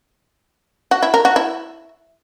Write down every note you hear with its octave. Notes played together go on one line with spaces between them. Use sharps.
F#4
E4
A#4
F#4
E4